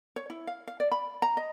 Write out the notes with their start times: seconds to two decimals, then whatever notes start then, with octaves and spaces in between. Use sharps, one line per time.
0.16 C#5
0.30 E4
0.47 F5
0.67 F5
0.80 D5
0.92 B5
1.22 A#5
1.37 D#5